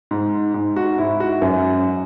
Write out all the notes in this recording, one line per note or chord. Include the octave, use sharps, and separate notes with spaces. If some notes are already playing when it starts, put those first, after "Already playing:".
G#2
G#2
F#4
G#2 E4
F#4
F#2